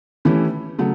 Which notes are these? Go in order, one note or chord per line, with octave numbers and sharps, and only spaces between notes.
E3 A3 C#4 E4 G4
C#3 F#3 A3